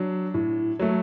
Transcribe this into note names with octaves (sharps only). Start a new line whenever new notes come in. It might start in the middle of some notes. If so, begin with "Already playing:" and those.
Already playing: F#3 D4
A2
F#3 A3